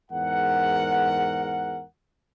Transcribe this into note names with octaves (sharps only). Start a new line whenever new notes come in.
E2 G#2 A#4 F#5